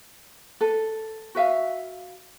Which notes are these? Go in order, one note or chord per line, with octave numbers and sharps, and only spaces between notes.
A4 B4
F#4 B4 E5 F5